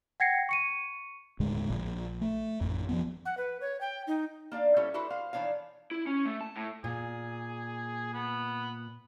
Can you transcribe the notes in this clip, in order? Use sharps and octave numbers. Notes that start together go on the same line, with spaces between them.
F#5 G5 G#6 A#6 C7 C#7
C#6 C#7 D#7
D#1 A2 D3 G#3
A#1
A3
A1 F2
F3 F#3 B3
F#5
B4
C#5
G5
D#4
A#3 D4 D5 F5
G3 C#4 E4 G4 A4 C#5
D4 E4 F#4 A4 B4 C5
C5 F5
D#3 E3 D4 C#5 F5
E4
C#4
A3
A5
A2
A#2 G#4
B3